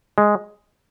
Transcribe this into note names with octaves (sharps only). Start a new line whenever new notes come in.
G#3